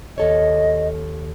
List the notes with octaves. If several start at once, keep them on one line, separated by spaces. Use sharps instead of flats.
D#2 A4 C#5 D#5